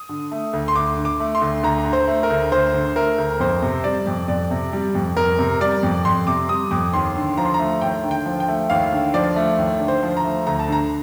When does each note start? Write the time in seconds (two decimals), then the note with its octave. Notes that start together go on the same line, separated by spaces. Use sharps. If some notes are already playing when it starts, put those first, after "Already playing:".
Already playing: D#6
0.09 D3
0.31 A3
0.53 D2
0.68 C6
0.75 D2 D6
0.97 D3
1.05 D6
1.20 A3
1.35 C6
1.42 D2
1.63 D2 A#5
1.86 D3
1.93 C5
2.07 A3
2.23 A#4
2.30 D2
2.52 D2 C5
2.74 D3
2.96 A3 A#4
3.18 D2
3.40 F2 C5
3.62 C3
3.84 G3 D5
4.07 F2
4.28 F2 D5
4.51 C3
4.73 G3
4.95 F2
5.17 F2 A#4
5.39 C3
5.61 G3 D5
5.83 F2
6.05 F2 C6
6.27 C3 D6
6.49 G3 D#6
6.71 F2 D6
6.93 D#2 C6
7.16 D3
7.37 F3 A#5
7.45 C6
7.54 A3 A#5
7.81 D#2 G5
8.04 D3
8.11 G5
8.26 F3
8.40 G5
8.48 A3
8.70 D#2 F5
8.93 D3
9.14 F3 D5
9.36 A3
9.58 D#2
9.80 D3
9.88 C5
10.03 F3
10.17 A#5
10.24 A3
10.47 D2 A#5
10.59 A5
10.68 D3 A#5